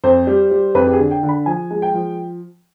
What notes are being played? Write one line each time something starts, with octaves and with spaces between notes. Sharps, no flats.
F2 C5
G3
G3
F2 B4
G4
G#4
D3
G5
D3
B5
F3 G#5
G#3
G5
F3